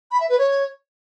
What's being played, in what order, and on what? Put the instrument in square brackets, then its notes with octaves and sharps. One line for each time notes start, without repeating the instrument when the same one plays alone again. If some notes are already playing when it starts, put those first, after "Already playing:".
[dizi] B5
E5
B4
C#5